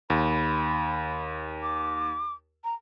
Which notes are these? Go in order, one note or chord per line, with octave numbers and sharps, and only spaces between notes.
D#2 B5
D6
A#5